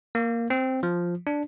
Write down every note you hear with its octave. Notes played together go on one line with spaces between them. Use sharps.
A#3
C4
F3
D4